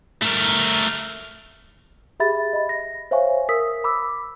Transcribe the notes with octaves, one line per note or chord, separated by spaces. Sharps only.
A3 A#4
G4 G#4 E5 B5 A6
D#5 B5
A#6
C5 C#5 E5 F5 G#5 C#6
A#4 D#6 E6 B6
B5 D6 E6